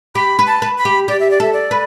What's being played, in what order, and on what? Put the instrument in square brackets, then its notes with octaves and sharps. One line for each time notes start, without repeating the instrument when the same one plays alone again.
[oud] G4 [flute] B5
[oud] B4
[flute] A5
[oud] B4
[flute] B5
[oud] G4
[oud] G4 [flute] D5
[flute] E5
D5
[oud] A4 [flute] E5
[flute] D5
[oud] B4